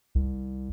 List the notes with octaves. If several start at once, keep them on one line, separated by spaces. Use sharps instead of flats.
C2